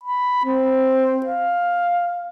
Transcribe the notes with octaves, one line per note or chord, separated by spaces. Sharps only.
B5
C4
F5